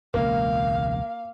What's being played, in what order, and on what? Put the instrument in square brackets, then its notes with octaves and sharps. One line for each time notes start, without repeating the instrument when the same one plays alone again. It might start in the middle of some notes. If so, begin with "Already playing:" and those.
[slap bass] E1 C#2 [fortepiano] A#3 [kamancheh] F5